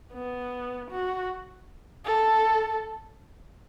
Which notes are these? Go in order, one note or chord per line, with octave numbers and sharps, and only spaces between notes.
B3
F#4
A4